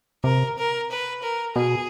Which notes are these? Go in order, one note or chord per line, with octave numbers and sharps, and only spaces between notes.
C3 A#4
A#4
B4
A#4
B2 G#4